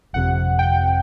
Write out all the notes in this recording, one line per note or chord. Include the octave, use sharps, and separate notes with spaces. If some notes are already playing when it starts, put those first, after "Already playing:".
G1 F2 C3 F#5
G5